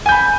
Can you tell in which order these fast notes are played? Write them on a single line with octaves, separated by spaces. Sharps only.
G#5 G6 B5